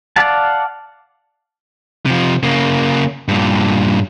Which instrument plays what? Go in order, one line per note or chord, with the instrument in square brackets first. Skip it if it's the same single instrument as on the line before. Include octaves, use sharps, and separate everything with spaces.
[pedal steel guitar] D5 F5 F#5 A5
[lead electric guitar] C3 F3
C#3 A#3
G2 A#2